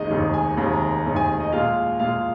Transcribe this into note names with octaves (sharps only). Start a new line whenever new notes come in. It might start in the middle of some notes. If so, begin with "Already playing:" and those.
Already playing: F1 D#2 D#3 G#3 D#5
F1 D#2 D#3 G#3
G#5
F1 D#2 D#3 G#3 A#5
A#5
A#5
F1 D#2 D#3 G#3
G#5
G#5
D#5
A#2 G#3 F4 F5
A#2 G#3 F4 F5